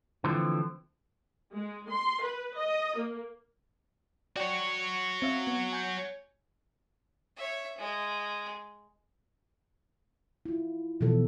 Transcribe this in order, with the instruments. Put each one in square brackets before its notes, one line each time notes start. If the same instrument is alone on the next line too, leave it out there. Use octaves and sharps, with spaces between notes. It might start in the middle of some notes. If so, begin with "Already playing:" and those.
[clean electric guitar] D3 E3 F3 A3 C4
[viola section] G#3
C6
B4
D#5
A#3
[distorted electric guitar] F#4 C#5 [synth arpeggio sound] D5 G5
[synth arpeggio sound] C4 E5 F5
B3
G#5 G6
[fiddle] C#5 E5
G#3
[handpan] E4 F4
B2 E3 F3 A4